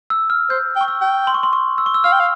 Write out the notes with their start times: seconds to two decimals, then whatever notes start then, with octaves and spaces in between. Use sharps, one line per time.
0.10 E6
0.30 F6
0.50 C5 G6
0.76 G5
0.81 C#6
0.88 E6
1.01 G5
1.27 C6
1.34 C#6
1.43 C6
1.53 C#6
1.78 E6
1.86 C#6
1.94 E6
2.04 F5 F6
2.12 G5
2.20 F5